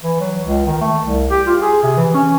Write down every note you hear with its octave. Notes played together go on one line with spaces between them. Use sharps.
E3
F#3
C#2
D#3
A3
C2
G4
F4
G#4
C3
E3
C#4